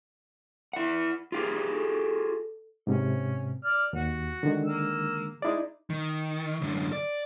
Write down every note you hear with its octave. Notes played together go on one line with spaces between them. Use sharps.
E4 F#5
F4 G4 G#4
A4
G#2 C3 C#4
D5 F6
D#2 F#4
D3 D#3 G#3
A#3 E6
G#3 D#4 E4 D5
D#3
F#2 D3
D5